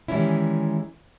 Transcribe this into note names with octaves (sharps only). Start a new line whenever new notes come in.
D#3 E3 G3 G#3 C#4 E4